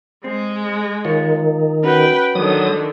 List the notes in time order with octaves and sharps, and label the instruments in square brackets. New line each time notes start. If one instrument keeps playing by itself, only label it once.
[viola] G#3 [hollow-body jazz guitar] C4
[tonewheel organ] D#3 [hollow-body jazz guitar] F4 C#5
[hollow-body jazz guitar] C#4 F#4 [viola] B4 G5
[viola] D3 D#3 [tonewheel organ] F#3 D#6